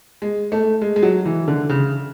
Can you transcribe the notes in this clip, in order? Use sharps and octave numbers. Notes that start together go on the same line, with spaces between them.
G#3
A3
G#3
G#3
F#3
E3
D3
C#3